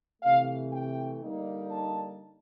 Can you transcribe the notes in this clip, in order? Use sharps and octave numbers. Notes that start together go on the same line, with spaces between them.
C3 E3 A3 F5
G5
D3 G3 A#3 D#4
A5